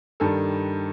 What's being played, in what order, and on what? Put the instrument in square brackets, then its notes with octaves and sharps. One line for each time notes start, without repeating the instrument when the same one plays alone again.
[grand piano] G2 D#3 G3 A4